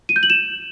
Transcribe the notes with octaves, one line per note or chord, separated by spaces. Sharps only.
D#7
G6
F#7
E7